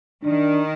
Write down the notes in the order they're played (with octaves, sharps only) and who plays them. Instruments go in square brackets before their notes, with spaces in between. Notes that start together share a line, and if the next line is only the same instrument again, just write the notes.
[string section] D#3 [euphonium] D4